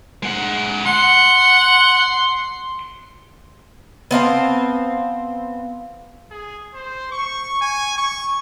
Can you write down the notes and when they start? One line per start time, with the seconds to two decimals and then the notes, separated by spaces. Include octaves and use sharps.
0.23 G#3 F#5
0.86 F#5 C6
4.11 B3 C4 F5 A5
6.31 G#4
6.74 C5
7.12 C#6
7.61 G#5
7.97 C#6